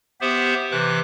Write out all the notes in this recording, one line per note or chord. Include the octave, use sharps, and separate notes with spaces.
B3 G4 C5 E5
C3 E3 D6 F#6